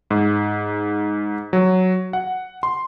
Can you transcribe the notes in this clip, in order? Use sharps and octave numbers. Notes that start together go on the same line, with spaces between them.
G#2
F#3
F#5
C6